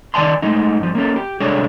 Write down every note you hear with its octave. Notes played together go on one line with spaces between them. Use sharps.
D#3 D5 G#5 A5 C6
G#3 A3 D#4
G2 F3
A#3 C#4 A4
G4
C2 G#3 D4 A4 C#5